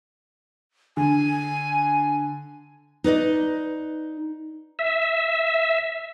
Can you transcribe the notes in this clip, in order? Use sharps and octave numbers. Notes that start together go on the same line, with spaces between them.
D3 G#5
D#4 B4 D5 D#5
E5